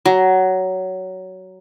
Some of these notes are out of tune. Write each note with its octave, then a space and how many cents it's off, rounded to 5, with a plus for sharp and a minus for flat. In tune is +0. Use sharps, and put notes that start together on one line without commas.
F#3 +15